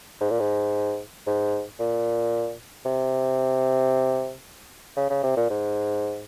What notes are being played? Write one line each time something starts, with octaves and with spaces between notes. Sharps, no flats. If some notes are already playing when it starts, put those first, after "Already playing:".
G#2
A#2
G#2
G#2
A#2
C3
C#3
C#3
C3
A#2
G#2